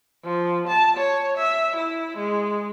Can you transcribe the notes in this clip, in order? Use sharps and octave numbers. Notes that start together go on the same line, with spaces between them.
F3
A5
C#5
E5
E4
G#3